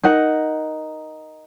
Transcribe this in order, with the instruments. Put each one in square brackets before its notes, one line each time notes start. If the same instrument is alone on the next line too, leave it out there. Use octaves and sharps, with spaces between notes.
[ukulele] D#4 A#4 F#5